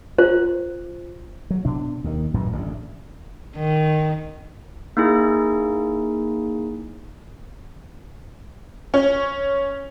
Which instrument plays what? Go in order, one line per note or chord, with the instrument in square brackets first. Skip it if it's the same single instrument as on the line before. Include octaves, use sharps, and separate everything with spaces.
[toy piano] F4 C5
[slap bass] F#3
B2 D4
D#2 D#3
A1 F#2 A#2 E3
A1 D3
[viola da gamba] D#3
[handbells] A#3 D#4 E4 G#4
[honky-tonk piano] C#4